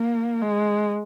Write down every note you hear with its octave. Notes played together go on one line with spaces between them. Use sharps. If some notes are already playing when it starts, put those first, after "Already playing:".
Already playing: A#3
G#3